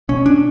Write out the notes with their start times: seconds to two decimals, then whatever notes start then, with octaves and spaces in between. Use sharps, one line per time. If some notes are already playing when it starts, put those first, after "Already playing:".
0.09 B2 C#4
0.26 D4